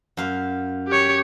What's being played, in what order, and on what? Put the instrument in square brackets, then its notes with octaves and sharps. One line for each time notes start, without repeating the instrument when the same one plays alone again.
[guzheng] F#2 F5
[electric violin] G4 C#5